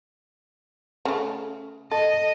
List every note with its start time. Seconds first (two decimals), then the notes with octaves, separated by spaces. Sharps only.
1.05 C#3 A3
1.91 A4 D#5